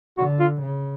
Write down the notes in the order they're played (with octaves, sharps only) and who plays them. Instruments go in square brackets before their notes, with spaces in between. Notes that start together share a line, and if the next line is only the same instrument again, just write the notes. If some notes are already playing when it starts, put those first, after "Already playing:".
[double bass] D3 [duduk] F#4
[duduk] F4
[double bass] C#3